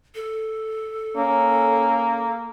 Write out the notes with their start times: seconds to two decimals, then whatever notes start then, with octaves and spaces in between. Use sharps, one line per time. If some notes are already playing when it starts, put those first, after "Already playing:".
0.15 A4
1.16 A#3 C#4